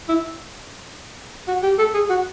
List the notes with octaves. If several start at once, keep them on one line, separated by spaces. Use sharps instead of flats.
E4
F#4
G4
A4
G#4
F#4